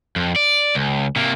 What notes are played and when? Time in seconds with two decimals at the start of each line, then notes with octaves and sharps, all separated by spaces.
0.16 F2
0.36 D5
0.75 C#2
1.16 C3 A#3